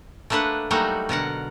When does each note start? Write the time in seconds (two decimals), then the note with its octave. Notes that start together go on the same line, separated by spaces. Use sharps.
0.30 A3 A#3 D4 B4 F#5
0.71 F#3 G3 A3 A#3 D#4 F#4
1.09 B2 D3 A#4 F#5